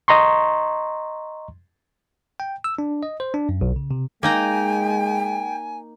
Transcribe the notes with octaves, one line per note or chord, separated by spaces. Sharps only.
D#5 A#5 C6 C#6
G5
E6
D4
D#5
C5
D4
F#2
B1
C#3
C3
G#3 A#3 D#4 G5 G#5 A#5